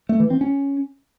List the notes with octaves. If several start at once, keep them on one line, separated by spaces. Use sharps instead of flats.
A3
E3
C4
C#4